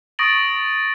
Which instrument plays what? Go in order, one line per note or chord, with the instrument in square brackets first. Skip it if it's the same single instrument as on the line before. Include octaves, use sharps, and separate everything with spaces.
[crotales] C#6 D#6 A6 A#6 D7 F#7